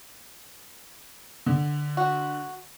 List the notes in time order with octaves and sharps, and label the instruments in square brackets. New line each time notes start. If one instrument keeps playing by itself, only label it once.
[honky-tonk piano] D3
[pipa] F#4